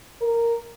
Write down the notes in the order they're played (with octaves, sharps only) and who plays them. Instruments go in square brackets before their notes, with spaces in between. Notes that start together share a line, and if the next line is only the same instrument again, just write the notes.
[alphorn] A#4